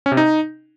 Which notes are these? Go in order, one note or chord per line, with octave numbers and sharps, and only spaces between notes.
C#4
C3
D#4